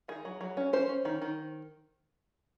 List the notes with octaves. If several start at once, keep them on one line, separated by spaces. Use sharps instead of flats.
D#3 G#4
F#3
F#3
C#4
C#4 C5
C#4
D#3
D#3